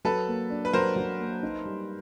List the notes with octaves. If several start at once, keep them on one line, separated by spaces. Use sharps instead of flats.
F#3 A4 B4
A#3
D4
B4
F#3 A#4 C5
F#3
A#3
D#4
G3